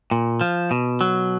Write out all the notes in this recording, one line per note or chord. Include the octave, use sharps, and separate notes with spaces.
A#2
F3
B2
F#3